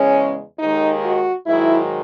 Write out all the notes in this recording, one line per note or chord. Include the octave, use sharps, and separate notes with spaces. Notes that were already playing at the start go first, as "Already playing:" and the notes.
Already playing: E2 C#3 G#3 C#4
D#2 D#3 G#3 D#4
F#4
G#2 D#3 F#3 E4